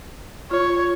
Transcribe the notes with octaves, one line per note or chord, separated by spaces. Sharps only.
F4 C#5